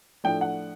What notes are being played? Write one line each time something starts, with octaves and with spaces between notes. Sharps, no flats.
A2 F3 A3 D4 G5
F#5